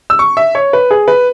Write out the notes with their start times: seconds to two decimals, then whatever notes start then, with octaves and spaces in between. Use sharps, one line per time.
0.10 E6
0.19 C#6
0.37 E5
0.55 C#5
0.73 B4
0.91 G#4
1.08 B4